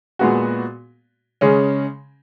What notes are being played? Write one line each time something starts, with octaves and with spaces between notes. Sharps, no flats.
A#2 G#3 B3 F#4
C#3 G#3 C#4